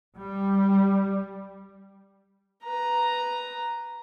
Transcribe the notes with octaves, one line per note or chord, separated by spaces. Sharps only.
G3
B4 A#5